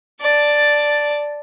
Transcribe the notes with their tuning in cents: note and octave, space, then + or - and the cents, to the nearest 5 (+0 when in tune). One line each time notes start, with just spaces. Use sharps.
D5 +0 A5 +0